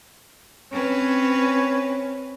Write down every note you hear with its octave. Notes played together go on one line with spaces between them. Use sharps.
C4 C#4 B4 C#5